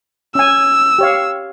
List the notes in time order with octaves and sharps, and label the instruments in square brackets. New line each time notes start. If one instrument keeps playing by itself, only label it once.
[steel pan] C#4 G#5 [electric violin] E6
[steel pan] G4 C#5 F5